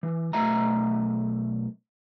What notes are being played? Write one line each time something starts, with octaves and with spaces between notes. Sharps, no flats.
E3
B1 A3 D#5 E5 A#5